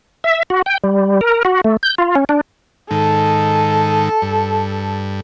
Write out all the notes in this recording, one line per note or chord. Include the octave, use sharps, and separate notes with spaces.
E5
F#4
G5
G3
A#4
F#4
A3
G6
F4
C#4
D4
G#2 D#3 A4
G2